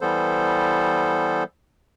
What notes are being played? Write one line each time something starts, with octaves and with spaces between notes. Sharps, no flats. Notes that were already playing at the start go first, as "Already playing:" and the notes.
E3 G3 B3 A4 C5